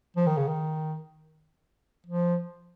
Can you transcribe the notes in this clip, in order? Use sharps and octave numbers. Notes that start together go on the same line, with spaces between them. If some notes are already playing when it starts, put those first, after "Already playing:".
F3
D#3
C#3
D#3
F3